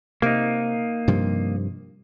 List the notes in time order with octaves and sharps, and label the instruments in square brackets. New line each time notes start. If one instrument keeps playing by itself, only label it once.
[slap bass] C3 [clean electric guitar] A#3 D#4
[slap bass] G2 C3 F3